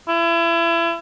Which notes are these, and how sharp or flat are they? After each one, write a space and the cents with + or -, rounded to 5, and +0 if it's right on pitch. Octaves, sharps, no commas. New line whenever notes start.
E4 +30